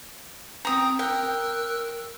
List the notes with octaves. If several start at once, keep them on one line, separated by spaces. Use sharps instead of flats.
C4 G5 A#5 D#6 G6
A#4 G5 E6 F#6